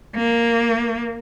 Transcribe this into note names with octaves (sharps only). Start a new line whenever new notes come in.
A#3